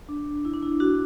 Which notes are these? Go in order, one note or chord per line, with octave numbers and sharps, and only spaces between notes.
D4
E4
D4
E4
D4 F#4